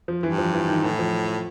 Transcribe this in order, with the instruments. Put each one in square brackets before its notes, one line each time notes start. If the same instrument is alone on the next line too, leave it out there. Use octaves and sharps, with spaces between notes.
[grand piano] F3
[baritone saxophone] G2 [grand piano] E3
[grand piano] F3
E3
D#3
[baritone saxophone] A2 [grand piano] E3
[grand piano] F3